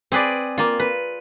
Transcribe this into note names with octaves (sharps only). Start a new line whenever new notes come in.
C4 G#4 B4 D5
A#3 F4
B4